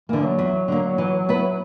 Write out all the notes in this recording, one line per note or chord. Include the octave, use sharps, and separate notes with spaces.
D3 E3 A#3
F#3
E2
D3 A#3
E3
B3 E4 B4